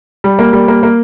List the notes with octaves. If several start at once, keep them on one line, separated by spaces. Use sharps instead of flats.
G3
A#3
G3
A#3
A#3